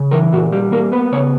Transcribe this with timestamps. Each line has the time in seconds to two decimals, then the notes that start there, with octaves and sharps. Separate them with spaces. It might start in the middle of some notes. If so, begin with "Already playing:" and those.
Already playing: C#3
0.11 E3 A#4
0.32 A#2 F#4
0.52 G3 G4
0.72 A#3 A#4
0.92 B3 B4
1.12 C#3 C#5